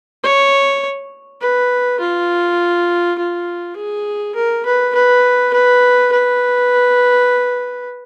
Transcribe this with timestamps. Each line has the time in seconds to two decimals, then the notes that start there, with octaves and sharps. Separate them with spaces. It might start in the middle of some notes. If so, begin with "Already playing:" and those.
0.24 C#5
1.41 B4
2.00 F4
3.18 F4
3.76 G#4
4.35 A#4
4.66 B4
4.95 B4
5.53 B4
6.12 B4